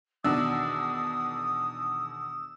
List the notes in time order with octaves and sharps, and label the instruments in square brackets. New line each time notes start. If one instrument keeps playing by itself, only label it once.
[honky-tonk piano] E2 B2 D#3 [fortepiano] D4 [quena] D#6 [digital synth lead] E6